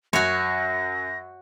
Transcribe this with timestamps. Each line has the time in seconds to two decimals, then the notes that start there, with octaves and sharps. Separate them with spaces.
0.13 F#2 F#4 C#5 A#6